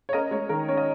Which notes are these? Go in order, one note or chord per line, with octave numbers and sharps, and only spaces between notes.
C#5
C#4 A#4 D#5
G#3 C#5
D#3 A#4
C#4 C#5
D#5